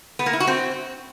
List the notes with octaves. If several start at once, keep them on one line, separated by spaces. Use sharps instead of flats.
B3
A#3
E4
F#4
C4